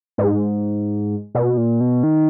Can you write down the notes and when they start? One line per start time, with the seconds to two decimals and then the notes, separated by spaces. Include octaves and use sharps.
0.18 G#2
1.35 B2
1.57 A#2
1.81 B2
2.03 D#3